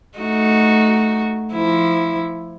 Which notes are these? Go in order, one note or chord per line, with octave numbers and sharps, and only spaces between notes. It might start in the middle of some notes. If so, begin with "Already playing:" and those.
A3 D#4 F#4
F3 E4